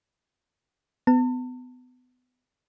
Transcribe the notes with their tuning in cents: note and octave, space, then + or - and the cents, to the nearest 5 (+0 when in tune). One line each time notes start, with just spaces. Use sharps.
B3 +25 A5 +40